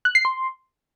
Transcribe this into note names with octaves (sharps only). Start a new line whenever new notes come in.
F#6
C7
C6